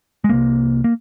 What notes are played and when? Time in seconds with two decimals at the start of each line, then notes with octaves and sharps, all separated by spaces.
0.24 G#3
0.29 C2 C3 A#3
0.84 A#3